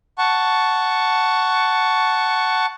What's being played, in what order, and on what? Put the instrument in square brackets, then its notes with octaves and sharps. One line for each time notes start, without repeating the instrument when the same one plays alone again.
[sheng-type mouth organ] F#5 A5 C#6